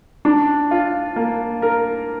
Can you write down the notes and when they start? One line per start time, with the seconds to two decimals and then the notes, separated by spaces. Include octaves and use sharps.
0.25 D4
0.71 F4
1.16 A#3
1.62 A#4